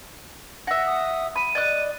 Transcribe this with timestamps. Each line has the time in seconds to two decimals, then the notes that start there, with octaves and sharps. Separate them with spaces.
0.67 E5 F#5 A#6
0.86 D#6
1.36 B5 D#7
1.55 D5 D#5 F#6